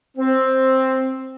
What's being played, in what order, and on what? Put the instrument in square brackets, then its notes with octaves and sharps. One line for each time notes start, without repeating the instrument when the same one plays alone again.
[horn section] C4